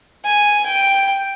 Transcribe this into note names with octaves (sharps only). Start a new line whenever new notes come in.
G#5
G5